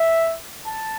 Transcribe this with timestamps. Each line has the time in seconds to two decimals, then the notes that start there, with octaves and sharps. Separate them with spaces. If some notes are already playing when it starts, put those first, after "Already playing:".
Already playing: E5
0.66 A5